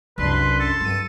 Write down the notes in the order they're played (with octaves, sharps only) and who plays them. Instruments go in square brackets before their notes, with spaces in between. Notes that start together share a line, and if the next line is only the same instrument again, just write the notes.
[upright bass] C2 E4 [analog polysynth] F#2 D4 C6 [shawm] B4
[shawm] A4
[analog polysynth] C2 G2 D#7 [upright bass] F#3